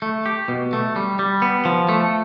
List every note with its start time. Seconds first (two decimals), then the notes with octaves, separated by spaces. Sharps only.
0.02 A3
0.26 G4
0.48 B2
0.73 A3
0.96 G3
1.19 G3
1.42 B3
1.65 F3
1.89 A3